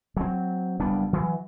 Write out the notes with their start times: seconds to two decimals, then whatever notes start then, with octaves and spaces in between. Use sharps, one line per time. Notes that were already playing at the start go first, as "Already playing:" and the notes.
0.17 F#3 C4
0.79 F#1 G3 B3 D4
1.13 E3 F#3